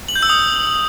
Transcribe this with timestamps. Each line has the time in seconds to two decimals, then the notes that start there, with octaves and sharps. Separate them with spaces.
0.08 F#7
0.16 G6
0.23 E6
0.30 D#6